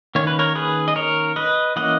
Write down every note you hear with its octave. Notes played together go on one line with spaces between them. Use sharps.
D#3 A#3 C#4 C#5
B4
A#4 C#5
G#4 B4
D#5
A#4 C#5
B4 D#5
E3 A#3 C#4 D#5 F#5